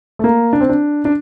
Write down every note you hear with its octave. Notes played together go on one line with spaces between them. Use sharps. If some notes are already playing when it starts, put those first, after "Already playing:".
A3
A#3
D4
C4
D4
D4